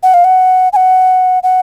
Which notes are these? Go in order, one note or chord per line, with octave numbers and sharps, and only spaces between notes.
F#5
F5
F#5
G#5
F#5
F#5